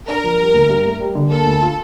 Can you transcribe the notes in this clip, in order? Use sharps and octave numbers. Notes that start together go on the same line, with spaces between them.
D4 A#4
F3
G3
D2
G2
A3
G3
D3
A#3 A4
D2
F4